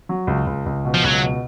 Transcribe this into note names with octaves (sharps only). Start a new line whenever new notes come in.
F#3
C#2
C#2
C#2
B2
F3
C#2 F#3
B2